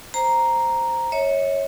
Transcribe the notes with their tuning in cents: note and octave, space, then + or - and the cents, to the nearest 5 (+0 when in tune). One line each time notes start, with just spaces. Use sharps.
C5 +0 A#5 +0
C#5 -5 E5 -40